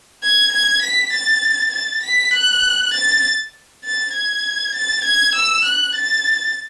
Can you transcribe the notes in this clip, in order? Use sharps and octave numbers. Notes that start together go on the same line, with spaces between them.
G#6
G#6
B6
A6
A6
B6
F#6
A6
A6
G#6
A6
G#6
E6
F#6
A6